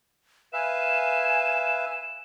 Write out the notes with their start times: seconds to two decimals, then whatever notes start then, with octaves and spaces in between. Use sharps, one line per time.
0.53 B4 E5 F5 G#5 E7